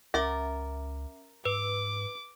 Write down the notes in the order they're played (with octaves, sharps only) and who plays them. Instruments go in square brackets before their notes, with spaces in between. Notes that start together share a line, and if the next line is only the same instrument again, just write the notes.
[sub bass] C#2 [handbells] C#4 E5 D6 [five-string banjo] A#4
[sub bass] G#2 [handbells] B4 [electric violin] D6